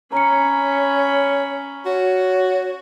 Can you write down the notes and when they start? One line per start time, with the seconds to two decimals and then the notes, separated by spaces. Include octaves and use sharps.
0.12 C#4 C#5 A#5 B5 C#7
1.86 F#4 C#5